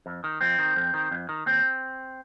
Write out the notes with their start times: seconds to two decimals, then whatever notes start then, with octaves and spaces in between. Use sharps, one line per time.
0.06 F2
0.24 D#3
0.41 F2 C4
0.59 D#3
0.76 F2
0.94 D#3
1.11 F2
1.29 D#3
1.46 D#2 C4